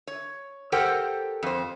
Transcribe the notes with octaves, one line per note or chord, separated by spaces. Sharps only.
C#5
G4 A4 A#4 C5 F#5 G5
F2 C5